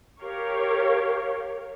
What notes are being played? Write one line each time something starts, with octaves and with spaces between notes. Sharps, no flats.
G4 A#4 C#5 F5